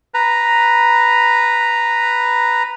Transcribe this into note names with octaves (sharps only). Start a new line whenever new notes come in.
B4 A#5